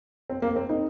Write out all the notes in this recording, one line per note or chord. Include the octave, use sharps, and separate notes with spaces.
C4
A#3
C4
D#4